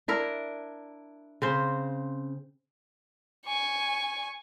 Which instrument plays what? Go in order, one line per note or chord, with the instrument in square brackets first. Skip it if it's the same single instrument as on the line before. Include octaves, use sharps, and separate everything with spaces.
[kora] D4 E4 A#4
C#3 C4 C5
[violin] G#5 C#6